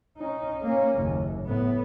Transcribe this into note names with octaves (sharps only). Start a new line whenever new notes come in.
C#4 D#4
A#3 C#4
F#1 D#2
A2 B3